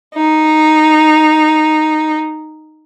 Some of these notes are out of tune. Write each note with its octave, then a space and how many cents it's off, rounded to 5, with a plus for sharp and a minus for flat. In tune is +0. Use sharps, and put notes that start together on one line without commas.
D#4 -5